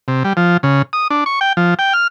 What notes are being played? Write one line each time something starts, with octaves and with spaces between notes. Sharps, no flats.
C3
G3
F3
C#3
D#6
D4
C#6
G5
F3
G5
F6